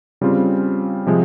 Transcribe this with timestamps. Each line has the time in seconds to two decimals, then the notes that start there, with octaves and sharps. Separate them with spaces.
0.21 C#3 G3 C4 F4
1.07 C3 F3 G#3